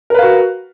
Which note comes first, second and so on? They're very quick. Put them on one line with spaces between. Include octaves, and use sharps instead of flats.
A#4 B4 F5 F#4